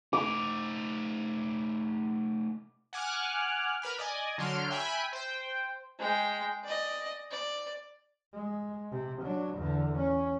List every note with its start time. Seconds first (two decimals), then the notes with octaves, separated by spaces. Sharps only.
0.13 A3 D#4 D6
2.93 F#5 G#5 D6 F6 F#6
3.82 A#4 B4 B5 F6
3.98 D5 D#5 G#5
4.38 D3 F#3 C6 F6 D7
4.70 E5 G5 G#5 B5 F#6
5.13 C5 G5
5.99 G#3 G5
6.64 D5 D#5
7.31 D5
8.34 G#3
8.91 C3
9.23 F#3 D4
9.56 E2 D3
9.99 C#4